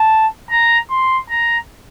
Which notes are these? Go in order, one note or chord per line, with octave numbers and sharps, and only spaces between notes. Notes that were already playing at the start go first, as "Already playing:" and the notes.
Already playing: A5
A#5
C6
A#5